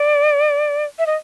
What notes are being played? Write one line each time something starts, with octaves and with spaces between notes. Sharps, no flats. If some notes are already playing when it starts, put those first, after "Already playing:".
Already playing: D5
E5
D#5